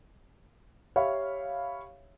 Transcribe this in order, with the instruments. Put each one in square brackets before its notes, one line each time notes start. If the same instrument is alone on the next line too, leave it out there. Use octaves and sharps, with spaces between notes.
[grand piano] G4 C#5 E5 F5 B5